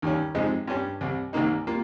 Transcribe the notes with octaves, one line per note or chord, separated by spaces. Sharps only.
D#2 D#3 G3 C#4
F2 C3 F3 G#3 D#4
G2 G3 C#4 G4
C2 C3 G3
C2 C3 D#3 A#3 D#4
G3 A#3 F4